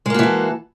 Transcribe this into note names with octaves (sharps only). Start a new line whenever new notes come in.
E3 G#3 A#3 F#4 A4